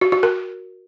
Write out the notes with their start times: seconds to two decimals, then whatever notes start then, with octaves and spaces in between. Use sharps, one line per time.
0.01 F#4
0.12 F#4
0.23 A#4